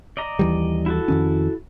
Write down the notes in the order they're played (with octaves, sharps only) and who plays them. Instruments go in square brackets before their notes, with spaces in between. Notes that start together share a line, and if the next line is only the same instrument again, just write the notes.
[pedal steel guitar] D5 D#5 A#5
[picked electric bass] D#2 E3 G3
[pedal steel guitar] E4 F#4 A4
[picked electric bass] F2 D#3 C#4